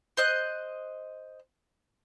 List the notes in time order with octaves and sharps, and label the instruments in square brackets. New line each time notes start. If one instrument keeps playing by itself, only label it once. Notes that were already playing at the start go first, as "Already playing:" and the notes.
[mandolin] C5 D#5 F#6